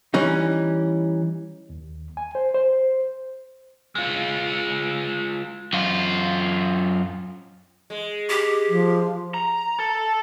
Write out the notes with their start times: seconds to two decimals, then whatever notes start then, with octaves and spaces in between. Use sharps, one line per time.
0.14 E3 G3 C#4 D#4
1.70 D#2
2.17 G#5
2.35 C5
2.54 C5
3.95 G#3 F4
5.73 F#2 F4
7.90 G#3
8.29 G4
8.68 F3
9.34 A#5
9.79 A4